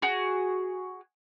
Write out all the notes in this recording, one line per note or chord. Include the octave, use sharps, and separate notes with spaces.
F#4 G#4